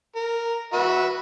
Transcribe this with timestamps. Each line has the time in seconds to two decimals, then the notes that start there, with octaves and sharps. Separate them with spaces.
0.16 A#4
0.73 F#4 B4 E5